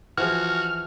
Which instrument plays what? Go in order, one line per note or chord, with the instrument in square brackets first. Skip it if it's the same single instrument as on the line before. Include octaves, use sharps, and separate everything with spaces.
[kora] E3 F3 G#4 [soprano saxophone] F#4 [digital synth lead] F6